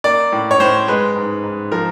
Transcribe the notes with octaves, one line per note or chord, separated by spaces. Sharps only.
A#3 D5
A2
C#5
A2 C5
G#3 B4
G#2
G#2
F3 A#4